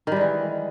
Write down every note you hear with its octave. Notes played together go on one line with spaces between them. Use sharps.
D#3 E3 G3 G#3